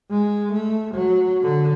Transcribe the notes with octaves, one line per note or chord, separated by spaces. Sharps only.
G#3
A3
F#3
D3